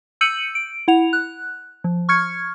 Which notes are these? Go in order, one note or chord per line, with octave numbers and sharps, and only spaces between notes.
E6 G6 C#7 D#7 F#7
D7
E4 F#5 F7
F#6
F3
C#6 F6 G#6 C#7